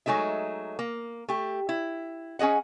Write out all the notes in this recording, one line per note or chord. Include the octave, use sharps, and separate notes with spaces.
F#3 G#3 A3 D#4 E5
A#3
A3 G4
E4
C#4 G#4 D#5 F#5